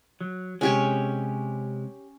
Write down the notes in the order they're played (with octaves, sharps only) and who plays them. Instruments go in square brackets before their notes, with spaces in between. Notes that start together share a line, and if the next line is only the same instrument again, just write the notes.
[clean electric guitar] F#3
[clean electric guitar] C3 G#3 [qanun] C#4 G4 C#5